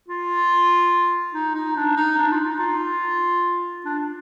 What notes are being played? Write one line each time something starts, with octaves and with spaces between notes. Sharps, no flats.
F4
D#4
D#4
D4
D#4
D4
F4
D#4
F4
D4